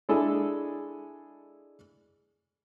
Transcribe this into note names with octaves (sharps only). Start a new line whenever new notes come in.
G#3 D4 E4 G#4 A4